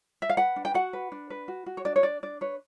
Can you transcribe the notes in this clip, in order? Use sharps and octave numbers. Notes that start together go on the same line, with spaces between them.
E5
F5
B4 F#5
D4
G5
F#4 F#5
B4
D4
B4
F#4
F#4
C#5
D4 D5
C#5
D4 D5
D4 D5
B4 C#5